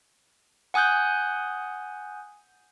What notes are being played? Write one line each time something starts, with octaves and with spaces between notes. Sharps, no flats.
F#5 G#5 D#6 F#6 G6